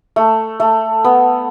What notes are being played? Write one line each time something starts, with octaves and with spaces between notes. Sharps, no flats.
A3
A3
B3